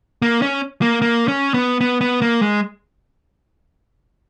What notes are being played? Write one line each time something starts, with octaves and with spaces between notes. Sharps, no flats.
A#3
C#4
A#3
A#3
C#4
B3
B3
B3
A#3
G#3